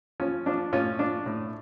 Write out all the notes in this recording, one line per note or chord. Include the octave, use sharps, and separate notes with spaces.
F3 C#4
F3 D4
A2 C#4 F4
F3 D4
A2